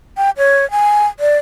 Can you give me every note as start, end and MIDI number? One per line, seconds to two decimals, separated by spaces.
0.17 0.30 79
0.37 0.69 73
0.71 1.07 80
1.20 1.37 74